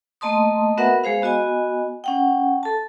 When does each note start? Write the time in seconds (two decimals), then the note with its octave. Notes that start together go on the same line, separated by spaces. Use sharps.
0.21 A3 A#3 D#5 A5 C6 D#6
0.78 B3 F#4 A#4 B4 E5 F#5
1.04 G#3 G#4 C5 F5
1.22 B3 F#4 D#5 G#5
2.04 C#4 F#5 G5
2.63 A4 A5